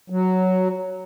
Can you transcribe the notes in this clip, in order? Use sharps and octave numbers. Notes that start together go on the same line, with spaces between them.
F#3